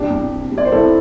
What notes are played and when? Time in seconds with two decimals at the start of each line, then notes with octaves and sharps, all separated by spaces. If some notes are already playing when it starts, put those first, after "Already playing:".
Already playing: C2 D4 G4
0.10 C2
0.31 C3
0.51 G3
0.58 D5
0.65 C5
0.72 C2 E4 A4